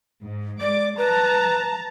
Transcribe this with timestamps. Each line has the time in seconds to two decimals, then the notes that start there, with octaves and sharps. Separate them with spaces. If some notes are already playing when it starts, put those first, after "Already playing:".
0.22 G#2
0.61 G#3 D5 D6
0.98 B4 A5 A#5